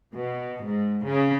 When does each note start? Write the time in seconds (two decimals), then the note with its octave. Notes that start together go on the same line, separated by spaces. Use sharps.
0.15 B2
0.65 G#2
1.06 C#3